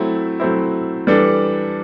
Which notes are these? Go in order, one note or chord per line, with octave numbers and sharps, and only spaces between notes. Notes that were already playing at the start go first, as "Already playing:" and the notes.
Already playing: F#3 A3 C4 E4
F#3 A3 C4 E4
E3 G3 D4 A4